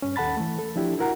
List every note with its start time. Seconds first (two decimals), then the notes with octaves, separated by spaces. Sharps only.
0.02 G2 C#4
0.16 D#2 A4 F#5 A5 B5 A6
0.37 E3 A3
0.59 A4
0.76 F3 D4 E4 G4
0.99 E4 F#4 A#4 F#5 A#5